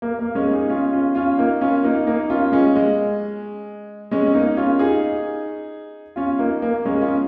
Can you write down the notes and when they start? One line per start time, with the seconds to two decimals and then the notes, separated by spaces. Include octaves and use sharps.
0.02 A#3
0.19 A#3
0.35 G#3 C#4
0.53 D#4 G#4
0.69 C#4 F4
0.93 C#4 F4
1.15 C#4 F4
1.38 A#3 D#4
1.61 C#4 F4
1.83 A#3 D#4
2.07 A#3 D#4
2.30 C#4 F4
2.52 G#3 C#4
2.76 G#3
4.11 G#3 C#4
4.26 C#4
4.34 A#3 D#4
4.57 C#4 F4
4.79 D#4 G#4
6.16 C#4 F4
6.39 A#3 D#4
6.62 A#3
6.85 G#3 C#4
7.01 C#4 F4